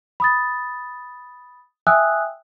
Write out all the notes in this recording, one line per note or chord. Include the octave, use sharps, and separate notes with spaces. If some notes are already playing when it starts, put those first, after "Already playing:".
B5 D#6 A6
E5 G5 G#5 D#6 E6 F#6